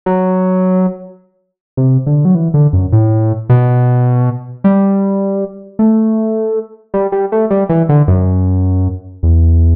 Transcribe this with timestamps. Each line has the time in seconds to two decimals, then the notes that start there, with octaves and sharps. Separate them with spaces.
0.06 F#3
1.77 C3
2.07 D3
2.25 F#3
2.35 E3
2.54 D3
2.73 F#2
2.92 A2
3.49 B2
4.64 G3
5.79 A3
6.94 G3
7.12 G3
7.32 A3
7.50 G3
7.69 E3
7.89 D3
8.08 F#2
9.23 E2